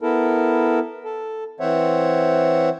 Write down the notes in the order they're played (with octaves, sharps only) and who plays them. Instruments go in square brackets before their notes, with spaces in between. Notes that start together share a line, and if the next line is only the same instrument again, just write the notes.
[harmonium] B3 E4 A4 A#4
A4
E3 C4 C5 C#5 E5 F#5